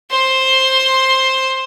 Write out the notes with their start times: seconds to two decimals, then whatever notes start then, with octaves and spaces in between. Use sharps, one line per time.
0.11 C5 C6